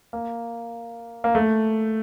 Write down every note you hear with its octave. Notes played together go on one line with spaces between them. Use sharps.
A#3
A#3
A3